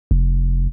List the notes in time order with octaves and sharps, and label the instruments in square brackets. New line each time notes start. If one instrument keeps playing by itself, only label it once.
[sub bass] F1